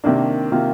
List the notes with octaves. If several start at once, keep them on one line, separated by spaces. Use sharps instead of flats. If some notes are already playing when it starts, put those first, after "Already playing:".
C3 D#3 A#3 D4
C3 D#3 A#3 F4